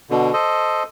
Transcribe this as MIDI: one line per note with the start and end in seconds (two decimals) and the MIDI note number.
0.11 0.33 47
0.11 0.33 50
0.33 0.83 69
0.33 0.83 72
0.33 0.83 75